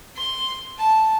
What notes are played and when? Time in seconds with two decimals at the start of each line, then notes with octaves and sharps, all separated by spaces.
0.16 C6
0.78 A5